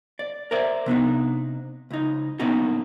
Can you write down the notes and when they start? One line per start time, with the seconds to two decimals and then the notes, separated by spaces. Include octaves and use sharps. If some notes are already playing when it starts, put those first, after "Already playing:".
0.19 D5
0.51 A#4 C5 D5 E5
0.86 C3 B3 D4 D#4
1.91 C#2 D#4
2.39 A#2 D3 B3 C#4 D#4 F#4